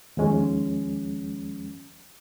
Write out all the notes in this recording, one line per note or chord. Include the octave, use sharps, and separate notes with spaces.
D#2 F3 G#3 C#4